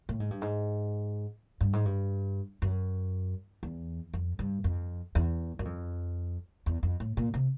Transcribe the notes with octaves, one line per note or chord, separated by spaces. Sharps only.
A2
G#2
G2
G#2
G2
G#2
G2
F#2
E2
F2
G2
F2
E2
F#2
F2
E2
F2
A2
A#2
C3